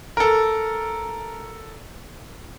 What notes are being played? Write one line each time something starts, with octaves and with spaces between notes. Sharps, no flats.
A4 A#4